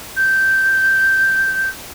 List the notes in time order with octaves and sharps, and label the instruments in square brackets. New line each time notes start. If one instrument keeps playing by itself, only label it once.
[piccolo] G6